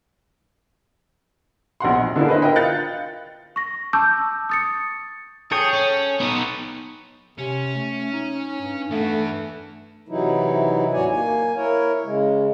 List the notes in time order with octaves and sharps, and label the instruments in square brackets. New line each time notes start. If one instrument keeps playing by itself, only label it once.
[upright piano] A#1 B2 F#5 C6
D#5
D3 A#3 D4 E4 G#4
B4 C5 D#5 E5
F4 A#4 D#5 G5
F5 F#6 G6 A6 C#7
[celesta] C#6 A#6
A5 C#6 D6 E6 G6
D#6 A6 C#7
[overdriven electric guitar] G#4 [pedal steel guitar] A4 C#5 G5
[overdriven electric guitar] C#4
B3 D#4
[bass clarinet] C3 [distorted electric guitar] C#4
[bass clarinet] A3
D#4
G2
[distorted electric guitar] E3 B3 [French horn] A3
[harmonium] C3 E3 F#3 D#4 E4
D#2 A2 F#4 C#5 D5 G#5
A#3 G#5
E4 A#4 C#5
C#3 G#3